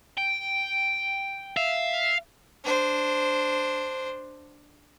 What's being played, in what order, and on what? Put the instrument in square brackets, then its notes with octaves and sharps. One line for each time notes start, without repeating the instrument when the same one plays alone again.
[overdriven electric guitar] G5
[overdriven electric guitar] E5 [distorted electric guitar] F5
[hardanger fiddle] D4 C5